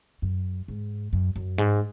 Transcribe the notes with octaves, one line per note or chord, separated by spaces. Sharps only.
F#2
G#2
F#2
F#2
G#2